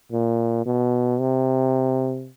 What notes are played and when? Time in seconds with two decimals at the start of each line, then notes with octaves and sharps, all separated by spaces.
0.12 A#2
0.66 B2
1.20 C3